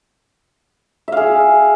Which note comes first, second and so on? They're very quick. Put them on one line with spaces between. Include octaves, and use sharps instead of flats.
E5 F5 G#4